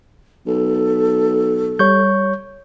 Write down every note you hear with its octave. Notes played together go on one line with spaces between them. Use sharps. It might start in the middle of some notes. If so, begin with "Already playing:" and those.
B1 A4
G3 C#5 C#6 G6